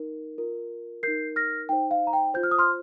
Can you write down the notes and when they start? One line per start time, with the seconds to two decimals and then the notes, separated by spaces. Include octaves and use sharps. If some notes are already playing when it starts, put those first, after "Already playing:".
Already playing: D#4 A#4
0.38 F4 A#4
1.03 D#4 A#4 G6 C7
1.36 F6 A#6
1.69 D#4 C5 G5
1.91 F5
2.07 A#5
2.13 G5
2.34 F4 C5 G6
2.43 F6
2.51 D#6
2.58 C6 F6